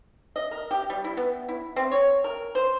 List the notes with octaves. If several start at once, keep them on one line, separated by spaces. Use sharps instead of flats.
D#5
A#4
G4
G3
E4
B3
E4
C4
C#5
A#4
C5